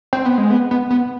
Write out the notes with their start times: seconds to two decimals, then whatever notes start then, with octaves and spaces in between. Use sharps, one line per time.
0.13 C4
0.26 B3
0.38 G#3
0.50 B3
0.71 B3
0.90 B3